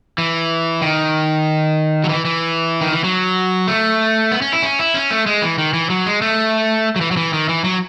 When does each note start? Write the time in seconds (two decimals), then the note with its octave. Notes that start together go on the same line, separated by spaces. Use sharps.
0.18 E3
0.82 D#3
2.04 F#3
2.09 E3
2.25 E3
2.81 D#3
2.92 E3
3.04 F#3
3.68 A3
4.32 B3
4.42 C#4
4.53 E4
4.62 C#4
4.79 E4
4.94 C#4
5.11 A3
5.26 G#3
5.42 E3
5.58 D#3
5.73 E3
5.90 F#3
6.06 G#3
6.22 A3
6.96 F#3
7.01 E3
7.11 F#3
7.17 E3
7.33 D#3
7.49 E3
7.64 F#3